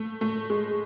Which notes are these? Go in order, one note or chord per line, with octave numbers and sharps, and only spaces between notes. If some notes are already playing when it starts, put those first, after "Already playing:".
Already playing: A3
A3
G#3